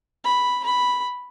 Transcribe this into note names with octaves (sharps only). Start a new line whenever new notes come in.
B5
B5